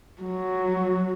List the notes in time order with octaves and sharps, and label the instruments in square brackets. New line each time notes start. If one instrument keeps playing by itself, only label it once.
[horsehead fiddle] F#3